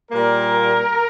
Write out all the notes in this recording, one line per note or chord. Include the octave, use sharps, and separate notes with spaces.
A#2 G3 A#3 A#4